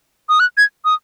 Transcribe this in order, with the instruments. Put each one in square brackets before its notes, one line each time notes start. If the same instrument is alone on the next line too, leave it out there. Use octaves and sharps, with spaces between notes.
[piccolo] D#6
F#6
G#6
D#6